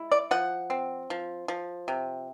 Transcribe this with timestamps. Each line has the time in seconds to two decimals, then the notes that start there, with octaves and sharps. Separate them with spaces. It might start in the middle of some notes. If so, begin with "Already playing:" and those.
Already playing: G#3 E4
0.12 D5
0.31 F3 F#5
0.70 C4
1.10 F3
1.48 F3
1.88 C3